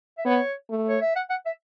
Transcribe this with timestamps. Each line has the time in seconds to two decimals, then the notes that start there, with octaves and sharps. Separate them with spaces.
0.18 E5
0.25 B3 C#5
0.70 A3
0.88 C#5
1.01 E5
1.16 F#5
1.30 F#5
1.46 E5